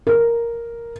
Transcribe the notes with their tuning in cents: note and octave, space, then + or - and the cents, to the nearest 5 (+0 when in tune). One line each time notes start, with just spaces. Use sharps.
A#4 +0